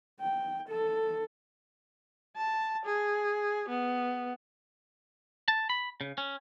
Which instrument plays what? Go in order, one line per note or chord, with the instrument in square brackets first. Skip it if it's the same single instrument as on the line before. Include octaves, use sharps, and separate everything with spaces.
[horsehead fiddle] G5
A4
[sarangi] A5
G#4
B3
[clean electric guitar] A5
B5
C#3
C#4